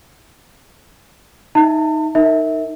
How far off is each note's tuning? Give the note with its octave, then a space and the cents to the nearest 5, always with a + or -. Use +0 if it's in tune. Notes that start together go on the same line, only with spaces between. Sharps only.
D#4 +5 E5 +0 A5 +45
D#4 +0 A#4 -25 E5 -25